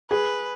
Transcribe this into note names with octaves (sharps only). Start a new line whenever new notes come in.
G#4 B4